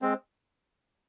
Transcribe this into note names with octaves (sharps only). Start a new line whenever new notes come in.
G#3 C4